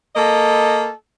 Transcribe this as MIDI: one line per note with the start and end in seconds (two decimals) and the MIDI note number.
0.16 0.90 58
0.16 0.90 69
0.16 0.90 75